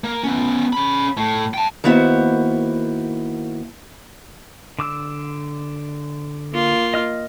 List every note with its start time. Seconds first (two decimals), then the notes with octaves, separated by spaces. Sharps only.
0.04 A#3
0.23 B3 C#4
0.73 C#4 B5
1.17 A2
1.54 G5 A5
1.84 D#3 A#3 B3 E4 F#4 C5
4.79 D3 D6 E6
6.52 A#3 F4
6.94 D#5 F6